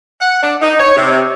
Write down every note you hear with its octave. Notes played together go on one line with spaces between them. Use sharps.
F#5
D4
D#4
C#5
C3